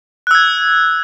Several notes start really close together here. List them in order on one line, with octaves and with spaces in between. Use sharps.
F#6 E6 G#6